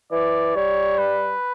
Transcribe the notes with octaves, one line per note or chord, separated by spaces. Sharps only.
E3 D5
G3 C#5
B4